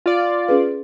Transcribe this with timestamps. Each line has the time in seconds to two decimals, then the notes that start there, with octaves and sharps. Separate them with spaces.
0.06 F4 D5
0.48 C#4 G#4 B4